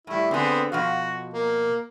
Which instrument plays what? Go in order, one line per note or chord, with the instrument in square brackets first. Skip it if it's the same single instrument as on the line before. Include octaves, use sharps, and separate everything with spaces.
[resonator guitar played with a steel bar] A2 G3 [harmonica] E4
[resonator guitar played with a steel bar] D3 G#4 [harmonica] B3 C4
[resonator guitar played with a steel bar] B2 F3 F5 [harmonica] F#4
[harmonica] A#3